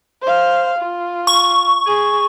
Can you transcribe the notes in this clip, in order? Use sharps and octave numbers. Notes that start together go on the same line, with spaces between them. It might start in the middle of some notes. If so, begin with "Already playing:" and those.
C5 F5
F4
C#6
G#4